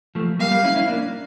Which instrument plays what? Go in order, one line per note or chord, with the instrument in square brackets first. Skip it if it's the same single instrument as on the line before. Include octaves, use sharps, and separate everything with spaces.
[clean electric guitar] F3 A3
[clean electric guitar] G3 A#3 [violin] F5
[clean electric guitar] G3 A#3
C#4 E4
C#4 E4
A#3 D4